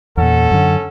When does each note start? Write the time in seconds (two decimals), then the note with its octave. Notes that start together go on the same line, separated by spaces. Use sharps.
0.17 E2 A#2 C#4 A4 F#5
0.51 F#2 D3